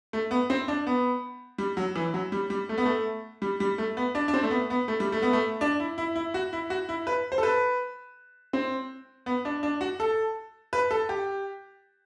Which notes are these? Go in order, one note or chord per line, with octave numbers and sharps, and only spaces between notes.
A3
B3
C4
D4
B3
G3
F#3
E3
F#3
G3
G3
A3
B3
A3
G3
G3
A3
B3
D4
D4
C4
A3
B3
B3
A3
G3
A3
B3
A3
D4
E4
E4
E4
F#4
E4
F#4
E4
B4
C5
A4
B4
C4
B3
D4
D4
F#4
A4
B4
A4
G4